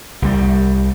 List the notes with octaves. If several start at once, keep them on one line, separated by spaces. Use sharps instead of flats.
C2 G3